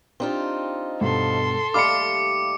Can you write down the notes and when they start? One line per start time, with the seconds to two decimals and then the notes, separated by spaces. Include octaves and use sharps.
0.20 C4 D4 D#4 F4 G4
1.01 G2 B2 A4 C6
1.74 D#2 G3 A3 F5 B5 D6 F6 C#7